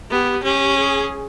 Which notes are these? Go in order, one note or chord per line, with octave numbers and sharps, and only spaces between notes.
B3 G4
C#4 G4
G#4